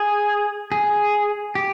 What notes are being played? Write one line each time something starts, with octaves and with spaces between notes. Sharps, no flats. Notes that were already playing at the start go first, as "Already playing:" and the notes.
Already playing: G#4
G#4
G4